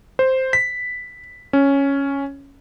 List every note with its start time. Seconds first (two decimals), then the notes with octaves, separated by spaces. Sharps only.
0.19 C5
0.53 B6
1.53 C#4